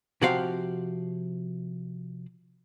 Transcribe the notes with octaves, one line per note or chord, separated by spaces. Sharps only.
C3 F3 F#4 G4 C5 F5